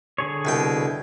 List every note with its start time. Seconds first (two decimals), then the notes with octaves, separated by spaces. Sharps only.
0.18 D3 G#4 C#5
0.45 C2 B2 G5